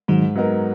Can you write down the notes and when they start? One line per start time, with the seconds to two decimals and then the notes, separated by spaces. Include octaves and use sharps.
0.08 G#2 D#3 F#3
0.36 F#3 B3 D#4 A#4